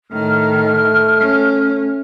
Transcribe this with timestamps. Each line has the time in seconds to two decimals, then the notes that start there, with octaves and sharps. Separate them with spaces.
0.12 A2 D#3 A3 F6
1.20 C#4